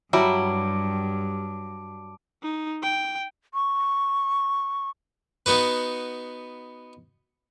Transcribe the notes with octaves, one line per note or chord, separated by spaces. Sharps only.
G2 F#3 G3 E4 A5 D6 D7
D#4
G5
C#6
B3 D#4 F#4 B4